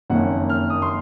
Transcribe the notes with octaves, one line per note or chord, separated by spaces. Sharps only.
F#1 F2 D#3 A#3 C#4 F#5
F6
D#6
C6